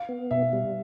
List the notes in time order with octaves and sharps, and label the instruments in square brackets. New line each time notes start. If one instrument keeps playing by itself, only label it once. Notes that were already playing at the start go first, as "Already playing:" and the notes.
Already playing: [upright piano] F5
[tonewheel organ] B3
[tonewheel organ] B2 [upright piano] E5
[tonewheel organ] G3